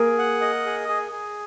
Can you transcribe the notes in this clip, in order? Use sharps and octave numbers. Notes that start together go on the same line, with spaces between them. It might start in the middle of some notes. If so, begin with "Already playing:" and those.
Already playing: A#3 G#4 A#4
F#5
D#5
G#4
G#4
G#4